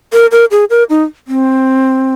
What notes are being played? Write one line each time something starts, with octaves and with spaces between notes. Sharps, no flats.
A#4
A#4
G#4
A#4
D#4
C4